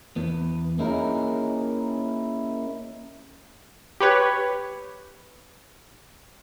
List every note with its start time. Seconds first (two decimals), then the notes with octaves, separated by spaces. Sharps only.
0.16 E2 B3
0.79 A#3 C#4 D#4 E4 G#4 A#4
4.00 G4 B4 C#5